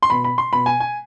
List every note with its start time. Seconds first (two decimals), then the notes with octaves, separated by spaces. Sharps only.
0.03 C6
0.10 B2 B5
0.24 B5
0.38 C6
0.52 B2 B5
0.66 G#5
0.80 G#5